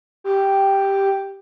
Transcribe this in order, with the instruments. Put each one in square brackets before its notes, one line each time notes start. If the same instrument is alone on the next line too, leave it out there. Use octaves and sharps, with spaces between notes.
[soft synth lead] G4